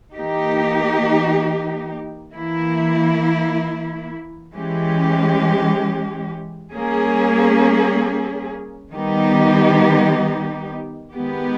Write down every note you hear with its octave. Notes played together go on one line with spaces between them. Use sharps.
E3 A#3 D#4 G4
E3 A#3 E4
E3 G#3 C#4 G4
G3 A#3 C#4 G#4
D#3 G3 B3 D#4 G4
D#3 G#3 B3 G4